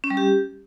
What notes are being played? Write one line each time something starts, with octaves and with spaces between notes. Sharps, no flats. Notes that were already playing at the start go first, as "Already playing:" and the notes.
C#4
G3
G4